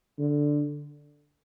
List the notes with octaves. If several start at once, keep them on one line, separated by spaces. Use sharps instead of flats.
D3